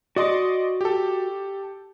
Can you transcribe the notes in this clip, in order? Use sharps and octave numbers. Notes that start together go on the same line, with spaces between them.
F#4 D5 D#5 C6 D6
G4 A4